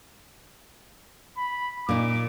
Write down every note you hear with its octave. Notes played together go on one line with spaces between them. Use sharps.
B5
A#2 D#4 D6